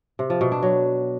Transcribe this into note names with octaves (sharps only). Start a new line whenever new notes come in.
C3
F3
B2
D4
F#3